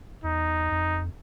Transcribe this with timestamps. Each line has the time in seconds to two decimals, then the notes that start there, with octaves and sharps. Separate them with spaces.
0.24 E2 D#4
0.71 F2